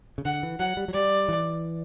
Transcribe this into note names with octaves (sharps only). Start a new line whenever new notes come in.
C#3
D3 F#5
E3
F#3 F#5
G3
F#3
G3 D5
E3